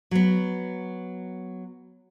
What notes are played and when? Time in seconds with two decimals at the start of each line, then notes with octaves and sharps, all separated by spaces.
0.11 F#3 B3